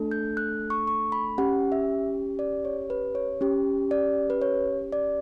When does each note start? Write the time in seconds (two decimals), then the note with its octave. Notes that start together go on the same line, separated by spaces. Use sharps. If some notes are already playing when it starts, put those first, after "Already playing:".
Already playing: A3 D4 A4
0.11 G6
0.37 F#6
0.70 C#6
0.87 C#6
1.12 B5
1.38 C#4 G4 F#5
1.72 E5
2.39 D5
2.65 C#5
2.90 B4
3.15 C#5
3.41 C#4 G4
3.91 D5
4.30 B4
4.41 C#5
4.92 D5